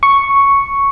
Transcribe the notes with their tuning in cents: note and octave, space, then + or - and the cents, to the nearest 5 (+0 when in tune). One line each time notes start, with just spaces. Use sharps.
C#6 +0